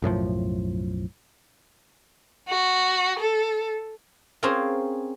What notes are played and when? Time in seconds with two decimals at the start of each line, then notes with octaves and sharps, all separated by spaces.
0.02 B1 F#2 A2 F3
2.48 F#4
3.20 A4
4.43 C4 C#4 F4 G#4 A#4